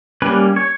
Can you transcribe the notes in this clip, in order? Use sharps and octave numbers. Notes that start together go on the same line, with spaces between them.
G3 A#3 C#4 B4
C#5